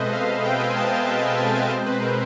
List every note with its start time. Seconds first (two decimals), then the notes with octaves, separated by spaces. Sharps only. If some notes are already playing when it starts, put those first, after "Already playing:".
Already playing: B2 G#3 C4 A4 B4 C5 D#5 E5
0.12 B2 F5
0.44 C4 G5
0.59 G#5
0.76 B2 A5
0.91 F5
1.08 G#3 E5
1.24 E5
1.40 B2 D#5
1.55 E5
1.70 C4 C5
1.86 B4
2.01 B2 A#4